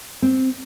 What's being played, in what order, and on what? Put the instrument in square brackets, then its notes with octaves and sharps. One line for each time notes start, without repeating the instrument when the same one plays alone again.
[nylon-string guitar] C4